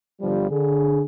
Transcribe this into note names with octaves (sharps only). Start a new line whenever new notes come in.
G1 F3 G3
D3 G#4